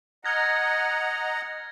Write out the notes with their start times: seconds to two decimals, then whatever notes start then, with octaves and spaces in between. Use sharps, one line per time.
0.25 D#5 F#5 A#5 F6 G#6 A#6